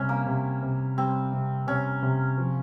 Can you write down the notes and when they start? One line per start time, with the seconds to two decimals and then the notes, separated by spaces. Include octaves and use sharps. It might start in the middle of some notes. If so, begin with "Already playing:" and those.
Already playing: C3 G3 C#4
0.09 A#3
0.27 C3
0.62 C3
0.97 G3 C4
1.33 C3
1.67 C3 C#4
2.02 C3
2.38 F3